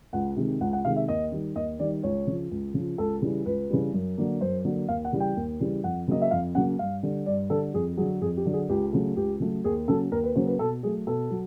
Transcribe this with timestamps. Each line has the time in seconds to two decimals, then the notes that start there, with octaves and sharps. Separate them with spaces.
0.13 C#2 F#5
0.36 C3 D#3 G#3
0.60 C#2 F#5
0.73 F#5
0.85 C3 D#3 G#3 F5
0.96 E5
1.08 D#2 D#5
1.32 D#3 G3
1.55 D#2 D#5
1.79 D#3 G3 D5
2.03 C#2 C#5
2.27 C#3 F3
2.51 C#2
2.74 C#3 F3
2.98 C#2 A4
3.22 C#3 E3 G3
3.46 C#2 B4
3.70 C#3 E3 G3
3.93 F#2
4.18 D3 F#3 A#3
4.41 F#2 C5
4.65 D3 F#3 A#3
4.88 D#2 F5
5.05 F#5
5.13 C#3 E3 G3
5.20 G5
5.36 D#2
5.60 C#3 E3 G3
5.84 F2 F#5
6.08 C#3 F#3 A#3 C#4 D#5
6.22 E5
6.31 F2 F5
6.55 C#3 F#3 A#3 C#4 F#5
6.79 G2 F5
7.03 D3 G3
7.26 G2 D5
7.50 D3 G3 A4
7.74 F2 G#4
7.97 F#3 G#4
8.01 D3
8.21 F2 G#4
8.37 G4
8.45 D3 F#3
8.53 G#4
8.69 C#2 G4
8.93 C#3 F#3 A3
9.16 C#2 G4
9.40 C#3 F#3 A3
9.64 D#2 G#4
9.88 C#3 F#3 A#3 C#4 A4
10.12 D#2 A#4
10.24 B4
10.35 C#3 F#3 A#3 C#4 C5
10.47 B4
10.59 B2 A4
10.83 F#3 A3 G#4
11.07 B2 A4
11.30 F#3